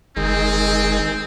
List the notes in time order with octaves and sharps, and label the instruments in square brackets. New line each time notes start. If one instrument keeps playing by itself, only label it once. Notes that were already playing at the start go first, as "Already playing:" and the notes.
[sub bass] F#1 [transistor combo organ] D#3 G#3 [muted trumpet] C4